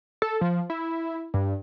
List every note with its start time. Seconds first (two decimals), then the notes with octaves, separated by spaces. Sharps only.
0.22 A4
0.41 F3
0.70 E4
1.34 G2